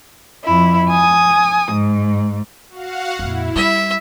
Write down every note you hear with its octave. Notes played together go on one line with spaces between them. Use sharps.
F2 E4
G#5 D#6
G#2
F#4 F5 F#5
F2 A#2 E4
G3 E5